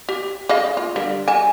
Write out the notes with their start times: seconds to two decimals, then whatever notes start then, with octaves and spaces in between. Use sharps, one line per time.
0.09 G4
0.49 G#4 D#5 F5
0.77 F4
0.96 D3 G3 A#4
1.28 G#5 A5